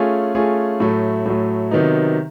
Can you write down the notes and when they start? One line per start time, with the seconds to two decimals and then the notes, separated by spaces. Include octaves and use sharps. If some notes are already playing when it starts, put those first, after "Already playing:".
Already playing: A3 C#4 F4 G#4
0.35 A3 C#4 F4 G#4
0.80 A2 F#3 A3
1.26 A2 F#3 A3
1.71 C3 D#3 F#3 B3 D#4